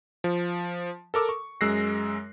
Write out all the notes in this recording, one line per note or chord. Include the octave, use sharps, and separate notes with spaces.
F3
A4 A#4 D6 E6
C#6
F#2 G#3 E6 F#6 A#6 C7